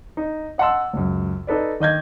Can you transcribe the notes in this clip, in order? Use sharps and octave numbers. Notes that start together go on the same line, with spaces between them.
D#4
D#5 F#5 A5 C6 E6
C#2 F#2
D#4 A4 B4 D5
D#3 D#5 G6 G#6